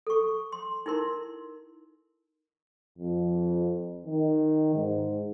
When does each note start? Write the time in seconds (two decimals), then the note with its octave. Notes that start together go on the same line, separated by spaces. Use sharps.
0.07 A4 C#6
0.52 C6
0.86 D#4 E4 A#4 C6
2.99 F2
4.06 D#3
4.75 G#2